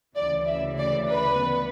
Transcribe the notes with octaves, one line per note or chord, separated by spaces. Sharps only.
D2 C#3 E3 D5
E5
D5
B4
B3